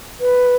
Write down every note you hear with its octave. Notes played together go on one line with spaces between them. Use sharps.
B4